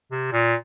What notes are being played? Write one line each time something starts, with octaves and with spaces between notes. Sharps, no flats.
C3
A#2